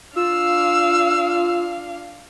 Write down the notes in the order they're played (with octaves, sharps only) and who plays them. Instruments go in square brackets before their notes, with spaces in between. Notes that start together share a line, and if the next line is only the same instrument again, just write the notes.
[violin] D4 F5 [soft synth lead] F4 [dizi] E6